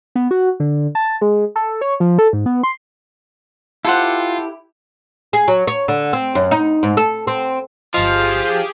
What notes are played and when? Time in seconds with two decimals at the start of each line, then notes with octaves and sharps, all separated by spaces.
0.15 B3
0.31 F#4
0.60 D3
0.95 A5
1.21 G#3
1.56 A4
1.81 C#5
2.00 F3
2.19 A4
2.33 G#2
2.46 B3
2.63 C6
3.85 E4 F4 G4 A4 C5 F5 F#5
5.33 G#4
5.48 F#3
5.67 C#5
5.88 D3
6.13 C4
6.35 F#2
6.51 D#4
6.83 G#2
6.97 A4
7.27 C4
7.94 G1 F3 F4 G4 G#4 D#5